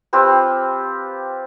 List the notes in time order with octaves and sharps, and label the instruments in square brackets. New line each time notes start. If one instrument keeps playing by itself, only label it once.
[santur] C4 F4 G4 B4